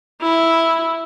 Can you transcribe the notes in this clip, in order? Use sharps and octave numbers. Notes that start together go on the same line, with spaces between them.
E4